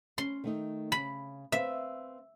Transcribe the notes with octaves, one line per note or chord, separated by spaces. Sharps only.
C#4 C6
D#3 A3 D#4
C#3 B5
C4 B4 E5 F5